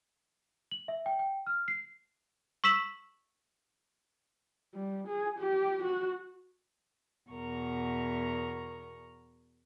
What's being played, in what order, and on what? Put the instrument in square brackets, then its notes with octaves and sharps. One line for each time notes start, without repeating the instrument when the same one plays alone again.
[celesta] F#7
E5
G5
G5
F6
C7
[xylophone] C#6 E6 B6 E7 F#7
[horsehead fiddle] G3
G#4
G4
F#4
[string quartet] E2 B2 A#4 A#5 C#6